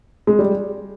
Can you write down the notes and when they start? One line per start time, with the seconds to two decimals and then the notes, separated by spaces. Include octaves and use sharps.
0.27 G#3
0.39 G3